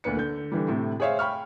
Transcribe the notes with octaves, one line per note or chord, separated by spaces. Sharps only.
D2 A#2 B4 C#7
D3 G6
D3 E3 G3
A2 C3 A3
G#4 C5 C#5 E5 F5
G5 B5 C#6 F6